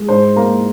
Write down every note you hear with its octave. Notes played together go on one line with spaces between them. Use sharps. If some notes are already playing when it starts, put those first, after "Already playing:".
Already playing: G#3
G#2 C5
A#3